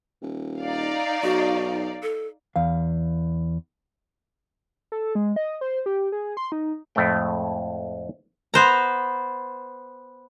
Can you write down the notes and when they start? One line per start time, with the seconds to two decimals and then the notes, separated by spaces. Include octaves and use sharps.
0.22 D#1
0.61 D#4 D5 F5
1.23 B1 F#4
2.03 A4
2.56 E2 F5
4.92 A4
5.15 G#3
5.36 D#5
5.61 C5
5.86 G4
6.12 G#4
6.37 C6
6.52 D#4
6.95 F2 A2 G#3 A3 G5
8.54 B3 C5 A#5